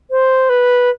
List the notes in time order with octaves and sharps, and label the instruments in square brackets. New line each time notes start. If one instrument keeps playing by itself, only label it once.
[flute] C5
B4